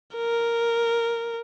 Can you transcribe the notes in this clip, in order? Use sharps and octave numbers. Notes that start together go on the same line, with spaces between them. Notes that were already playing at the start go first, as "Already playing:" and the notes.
A#4